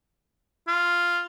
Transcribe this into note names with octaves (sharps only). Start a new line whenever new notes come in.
F4